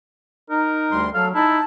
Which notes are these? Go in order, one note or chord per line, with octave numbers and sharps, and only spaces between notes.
D#4 A#4
D2 G3 C6
F#3 A4 F5
D#4 E4 A5